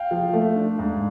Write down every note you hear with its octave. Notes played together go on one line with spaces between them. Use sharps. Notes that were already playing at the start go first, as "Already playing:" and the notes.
Already playing: F5 G5
F3
A3
D4
G#2